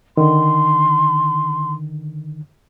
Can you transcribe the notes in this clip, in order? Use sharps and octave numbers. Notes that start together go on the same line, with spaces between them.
D3 D#3 C6